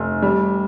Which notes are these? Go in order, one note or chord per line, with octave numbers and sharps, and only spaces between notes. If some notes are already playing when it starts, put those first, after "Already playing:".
Already playing: F1
G3